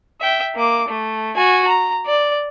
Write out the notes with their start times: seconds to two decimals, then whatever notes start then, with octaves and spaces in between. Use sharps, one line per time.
0.21 E5 G5
0.55 A#3 D6
0.88 A3
1.36 F#4 G#5
1.68 A#5
2.06 D5